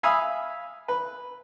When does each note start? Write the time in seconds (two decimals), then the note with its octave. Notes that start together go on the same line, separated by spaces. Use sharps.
0.03 E5 F5 G#5 B5 D#6 E6
0.88 B4